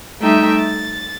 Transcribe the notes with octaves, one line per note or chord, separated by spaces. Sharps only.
G3 A3 D#4 E5 G5
A6